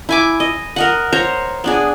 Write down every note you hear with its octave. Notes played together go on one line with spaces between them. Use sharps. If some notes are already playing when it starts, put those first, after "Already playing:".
E4 G#5 D6
D#5
A#4 D#5 F#5
C5 C#5 A#5
B3 D4 G#4